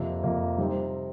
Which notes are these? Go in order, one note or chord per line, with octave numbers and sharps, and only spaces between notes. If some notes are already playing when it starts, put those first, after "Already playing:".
Already playing: F2 C3 F3 A#3
F2 C3 F3 A#3
C3 G3 C4 D#4